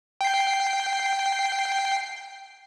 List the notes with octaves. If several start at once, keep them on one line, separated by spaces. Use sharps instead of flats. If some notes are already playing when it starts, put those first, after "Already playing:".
G5 C7